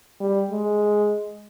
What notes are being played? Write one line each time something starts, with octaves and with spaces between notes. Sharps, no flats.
G3
G#3